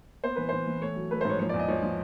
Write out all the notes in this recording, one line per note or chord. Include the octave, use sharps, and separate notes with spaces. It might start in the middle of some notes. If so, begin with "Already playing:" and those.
B3 C5
E3 B4
E3 C5
E3
A3 C#5
F#3
A3 B4
C5
G#2 C#5
F3 C#5
D5
E2
D#5
F3 C#5
F3